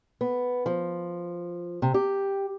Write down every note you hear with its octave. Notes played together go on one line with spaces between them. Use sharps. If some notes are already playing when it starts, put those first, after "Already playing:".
B3
F3
C3
G4